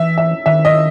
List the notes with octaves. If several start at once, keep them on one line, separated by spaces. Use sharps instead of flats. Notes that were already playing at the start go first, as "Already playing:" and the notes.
Already playing: E3 E5
E5
D#3 E5
D#5